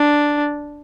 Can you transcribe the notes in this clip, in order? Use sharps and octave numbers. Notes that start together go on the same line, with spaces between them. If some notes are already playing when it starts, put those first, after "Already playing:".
Already playing: D4